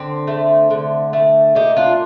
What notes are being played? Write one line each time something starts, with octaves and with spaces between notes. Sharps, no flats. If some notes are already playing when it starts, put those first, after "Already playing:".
Already playing: D3 C4
A3
D3
A3
A#2 D#4 G4
D4 F4